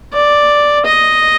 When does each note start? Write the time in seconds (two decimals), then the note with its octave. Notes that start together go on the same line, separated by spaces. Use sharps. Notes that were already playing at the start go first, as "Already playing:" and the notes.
0.13 D5
0.85 D#5